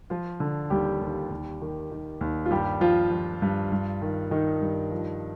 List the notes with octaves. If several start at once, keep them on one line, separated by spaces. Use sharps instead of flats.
F3 F4
D3
D#2 G3 G4
D#2
D#2
D#3
D#3
D#2
F4
G2 G3 G4
F3 F4
F3
G2
G2
D#3
D#3 D#4
G2
F3